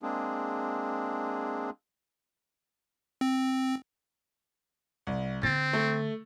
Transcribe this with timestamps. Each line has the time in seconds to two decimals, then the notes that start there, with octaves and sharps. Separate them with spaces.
0.03 G#3 A#3 C4 D4 G#4
3.21 C4
5.07 C2
5.43 D3 C4 A6
5.73 A3